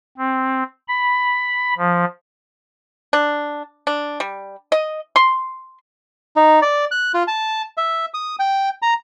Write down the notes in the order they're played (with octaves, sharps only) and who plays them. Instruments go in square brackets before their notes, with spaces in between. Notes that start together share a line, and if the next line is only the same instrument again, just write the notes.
[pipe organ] C4
B5
F3
[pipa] D4
D4
G3
D#5
C6
[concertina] D#4
D5
F#6
F4
A5
E5
D#6
G5
A#5